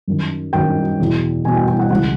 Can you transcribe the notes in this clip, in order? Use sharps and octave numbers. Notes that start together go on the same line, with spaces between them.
F#2 D#3
F#2 D#3 G5
E2 B2
E2 B2 G#5
G5
G5
F#5
C#2 C#3 E3 F#5